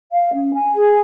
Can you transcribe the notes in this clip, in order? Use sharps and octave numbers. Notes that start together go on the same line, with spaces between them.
F5
C#4
G#5
G#4